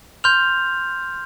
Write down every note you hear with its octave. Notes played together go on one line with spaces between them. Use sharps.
C6 F6 G6 F7